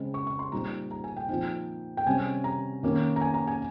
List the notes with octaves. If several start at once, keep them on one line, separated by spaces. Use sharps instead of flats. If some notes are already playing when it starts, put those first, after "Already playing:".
Already playing: C#3 G#3 C4
C#6
C#6
C6
A#2 G3 C4 D#4 A#5
A#5
G#5
G5
A#2 F3 C4 D#4
G5
C3 G3 C#4 G#5
A#5
D#3 A#3 C#4
A#5
G#5
A#5
G#5